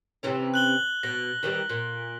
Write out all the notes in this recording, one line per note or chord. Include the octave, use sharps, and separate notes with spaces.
C3 E3 C#4
F#6 F#7 G7
B2 A#6
D#3 E3 G3
A#2